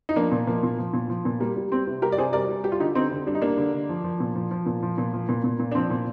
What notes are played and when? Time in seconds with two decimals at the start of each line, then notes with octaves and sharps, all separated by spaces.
0.09 D#4
0.16 F3 A#3 D4
0.32 A#2
0.47 F3 A#3
0.63 A#2
0.78 F3
0.94 A#2
1.09 F3
1.25 A#2
1.40 G3 A#3
1.56 G3
1.72 G3 C4
1.87 C3
2.02 G3 G4 A#4
2.12 D5
2.18 C3 G#4 C5
2.33 G3 A#4 D5
2.49 G3
2.64 G3 G4
2.72 F4
2.80 D3 D#4 G4
2.95 D3 C4 D#4
3.12 D3
3.27 G3 D4
3.35 D#4
3.42 G3 A#3 D4
3.57 D3
3.74 D3
3.89 F3
4.04 F3
4.20 A#2
4.35 F3
4.51 F3
4.66 A#2
4.82 F3
4.98 A#2
5.13 F3
5.29 A#2
5.44 A#2
5.60 A#2
5.71 D4
5.75 F3 C4
5.90 A#2